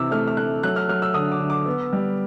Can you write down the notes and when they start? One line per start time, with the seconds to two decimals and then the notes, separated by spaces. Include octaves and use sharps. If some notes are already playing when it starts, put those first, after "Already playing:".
Already playing: C3 E3 D6 E6
0.11 A3 F6
0.28 F6
0.37 A3 F#6
0.63 F#3 F#6
0.76 F6
0.89 F#3 F6
1.02 E6
1.14 D3 D#6
1.32 D6
1.40 D3
1.50 D6
1.66 B3
1.93 G3